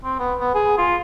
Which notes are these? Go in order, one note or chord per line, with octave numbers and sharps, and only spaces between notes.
C4
B3
B3
G#4
F4